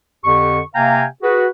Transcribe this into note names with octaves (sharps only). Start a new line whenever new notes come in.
F2 D3 G4 C#6
C3 A#3 F5 G5 G#5 A#5
F#4 G#4 B4